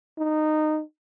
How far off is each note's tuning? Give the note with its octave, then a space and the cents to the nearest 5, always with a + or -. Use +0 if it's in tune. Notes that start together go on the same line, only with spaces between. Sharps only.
D#4 -15